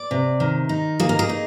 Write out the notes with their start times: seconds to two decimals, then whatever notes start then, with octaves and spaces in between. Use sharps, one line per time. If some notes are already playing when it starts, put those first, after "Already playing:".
Already playing: D5
0.11 C3
0.40 D#3
0.69 D#4
1.00 A#3 G#4
1.09 A#4
1.19 G#4
1.29 D#4